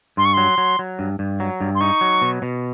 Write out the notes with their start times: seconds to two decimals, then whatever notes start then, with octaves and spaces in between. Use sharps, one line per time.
0.17 G2 C6
0.25 C#6
0.34 F#3 C6
0.58 F#3
0.79 F#3
0.99 G2
1.19 G2
1.40 F#3
1.61 G2
1.75 C6
1.81 D#4 C#6
2.01 F#3
2.22 B2
2.42 B2